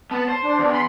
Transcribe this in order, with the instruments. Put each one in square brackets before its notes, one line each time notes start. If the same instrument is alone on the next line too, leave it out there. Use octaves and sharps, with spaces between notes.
[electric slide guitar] B3 B4 [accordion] A5
[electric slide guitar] C5
[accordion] D4
[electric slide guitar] E2
[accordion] B5 C6